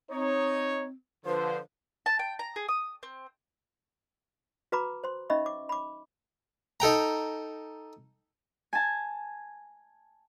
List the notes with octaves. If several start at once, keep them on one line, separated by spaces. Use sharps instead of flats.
C4 D#4 C#5
D3 F3 B4 C5
A5
G5
A#5
G#4
D#6
C4
F#4 B4 A#5 B5 D6
C5 C6
C#4 D#4 D#5 E5 B5 C#6
D6
B5 D6
D#4 A4 G5 A#5
G#5 A5